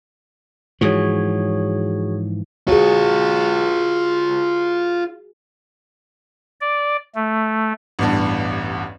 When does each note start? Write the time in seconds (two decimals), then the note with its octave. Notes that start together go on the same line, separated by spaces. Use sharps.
0.81 G#2 E3 F3 F#4 G#4 C#5
2.68 F4 F#4 G#4 C#5
6.61 D5
7.15 A3
7.99 A1 E2 G2